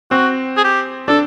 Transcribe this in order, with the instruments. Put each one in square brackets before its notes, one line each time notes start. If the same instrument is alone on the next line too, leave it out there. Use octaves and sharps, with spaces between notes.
[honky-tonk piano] C4 [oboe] F#4
[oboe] G#4
G4
[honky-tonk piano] D4 [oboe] A4